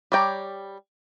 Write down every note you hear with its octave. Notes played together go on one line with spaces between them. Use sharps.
G3 C#5 D5 G5 A#5